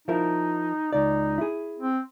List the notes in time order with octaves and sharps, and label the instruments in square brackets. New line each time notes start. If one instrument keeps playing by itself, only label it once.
[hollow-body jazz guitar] F3 E4 A#4 [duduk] D#4
[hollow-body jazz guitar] C#2 D5 [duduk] D#4
[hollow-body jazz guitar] E4 G#4
[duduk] C4